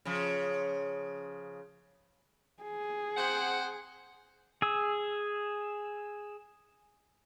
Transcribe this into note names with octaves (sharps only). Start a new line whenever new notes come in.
C#3 F3
G#4
C4 C5 F#5
G#4 E6